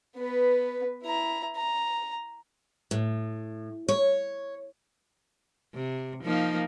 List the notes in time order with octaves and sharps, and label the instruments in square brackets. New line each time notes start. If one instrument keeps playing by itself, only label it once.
[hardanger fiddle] B3 B4
E4 A#5
A#5
[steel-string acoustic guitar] A2
C#5
[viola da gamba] C3
F3 A#3 D#4